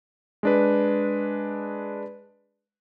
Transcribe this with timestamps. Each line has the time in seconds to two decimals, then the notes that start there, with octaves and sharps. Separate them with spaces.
0.43 G#3 D4 B4